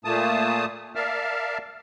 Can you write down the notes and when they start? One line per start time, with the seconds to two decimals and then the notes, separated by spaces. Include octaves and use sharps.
0.05 A#2 A3 A#3 A5 D#6
0.95 A#4 D5 E5 F5 A5 F6